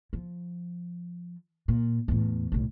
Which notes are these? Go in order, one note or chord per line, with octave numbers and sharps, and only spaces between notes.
F3
A#2
E2 A2
B1 A2